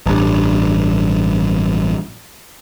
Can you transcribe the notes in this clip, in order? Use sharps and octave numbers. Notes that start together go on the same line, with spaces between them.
A1 G2